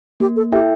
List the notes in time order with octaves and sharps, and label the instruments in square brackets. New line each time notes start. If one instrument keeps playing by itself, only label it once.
[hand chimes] A#3 [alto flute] G4
[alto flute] A4
[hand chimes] E4 A4 E5 G5 [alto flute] G4